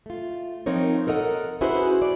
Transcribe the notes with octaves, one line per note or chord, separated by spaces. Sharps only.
A3 F4
F3 C4 D#4 A#4 C#5
A4 A#4 D#5 F5 F#5
C#4 E4 F#4 G#4 B4 C5
D5